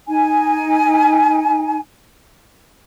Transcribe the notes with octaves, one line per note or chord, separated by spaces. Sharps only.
D#4 G#5